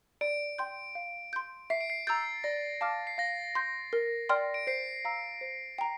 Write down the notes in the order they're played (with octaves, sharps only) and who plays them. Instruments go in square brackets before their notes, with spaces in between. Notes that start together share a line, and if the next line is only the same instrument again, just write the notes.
[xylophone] D5 [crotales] D7
[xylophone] G5 C6 G6
F5
C6 G6
[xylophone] E5 [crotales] C7
[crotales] D7
C7
[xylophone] A#5 E6 G6 [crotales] A6
[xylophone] D5 [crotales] A#6
[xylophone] F5 A5 D6 F6
[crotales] C7
[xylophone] F5 [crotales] A#6
[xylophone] C6 G6
A#4
D5 G5 C6 F6
[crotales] D7
[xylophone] C5 [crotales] C7
[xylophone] F5 A#5 E6
C5
G5 A#5